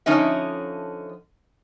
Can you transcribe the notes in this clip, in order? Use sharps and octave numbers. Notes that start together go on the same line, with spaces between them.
D3 F3 C#4 D#4 E5